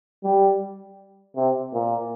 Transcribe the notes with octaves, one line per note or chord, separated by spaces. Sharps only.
G3
C3
A#2